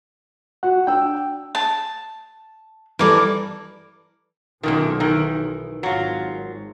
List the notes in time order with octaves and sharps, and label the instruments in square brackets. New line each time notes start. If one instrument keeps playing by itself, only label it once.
[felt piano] F#4 [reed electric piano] F#5
[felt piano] D4 E6 [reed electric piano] G5
[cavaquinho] A5
[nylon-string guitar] E3 G3 A4 [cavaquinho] A#4 D5
[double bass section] B1 [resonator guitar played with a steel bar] F#2 A#2 D#3
[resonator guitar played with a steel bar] D#3 E3
[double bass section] G#1 [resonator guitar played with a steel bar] F#3 F4